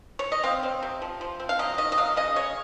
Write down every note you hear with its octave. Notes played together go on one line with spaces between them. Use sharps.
C#5
D#5
C4 F5
C4
C3
F3
F3
C4
F5
F#3 D#5
D#3 D#5
D#5
F#3 F5
C#3 D#5
C#3 C#5